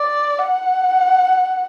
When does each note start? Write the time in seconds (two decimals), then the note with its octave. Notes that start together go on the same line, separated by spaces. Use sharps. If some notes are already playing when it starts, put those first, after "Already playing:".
Already playing: D5
0.38 F#5